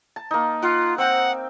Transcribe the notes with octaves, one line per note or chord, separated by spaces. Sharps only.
A5
A#3 D#4
F4 F#5
C4 F#5 G5